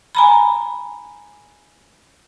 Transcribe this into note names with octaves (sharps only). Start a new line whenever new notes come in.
G#5 A#5 B5